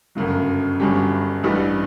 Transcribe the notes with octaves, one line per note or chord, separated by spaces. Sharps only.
G1 F#2 C#3 F#3
G1 G2 F#3 C#4 G4
A1 G2 E3 G3